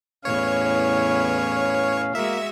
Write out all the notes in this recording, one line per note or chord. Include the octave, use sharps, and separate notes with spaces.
E2 A2 C#4 B4 C#5 F5
G#3 A#3 F#4 E5